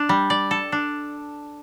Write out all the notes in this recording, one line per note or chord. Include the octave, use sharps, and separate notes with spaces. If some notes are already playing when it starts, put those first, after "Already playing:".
Already playing: D4
G3
D5
A4
D4